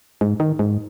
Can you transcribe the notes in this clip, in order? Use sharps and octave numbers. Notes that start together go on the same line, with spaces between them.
G#2
D#3
G#2